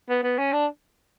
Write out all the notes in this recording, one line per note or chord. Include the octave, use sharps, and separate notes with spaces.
B3
B3
C#4
D4